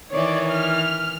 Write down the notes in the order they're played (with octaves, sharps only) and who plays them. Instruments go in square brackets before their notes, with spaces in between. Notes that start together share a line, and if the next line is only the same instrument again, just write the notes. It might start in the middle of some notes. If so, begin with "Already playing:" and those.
[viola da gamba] D#3 E3 [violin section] C#5 D5
[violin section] F6